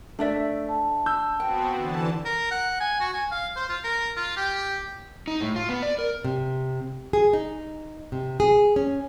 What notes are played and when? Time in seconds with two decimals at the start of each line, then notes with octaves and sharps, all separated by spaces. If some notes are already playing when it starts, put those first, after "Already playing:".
0.19 A3 D4 D5 E5
0.69 A5
1.06 E6 G6
1.40 B3 C4 F#4 G5
1.73 D3 E3 A5
2.25 A#4
2.51 F#5
2.80 G#5
3.00 F#4
3.13 G#5
3.31 F5
3.56 C5
3.69 F4
3.84 A#4
4.17 F4
4.37 G4
5.28 D#4
5.41 A2
5.56 F4
5.69 B3
5.82 D5
5.99 A#4
6.25 C3
7.13 G#4
7.33 D#4
8.12 C3
8.40 G#4
8.76 C#4